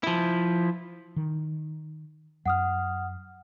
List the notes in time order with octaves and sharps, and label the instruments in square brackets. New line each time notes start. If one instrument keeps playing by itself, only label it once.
[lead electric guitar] F3 E4
[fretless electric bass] D#3
[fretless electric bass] F#2 [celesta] F#5 D#6 F6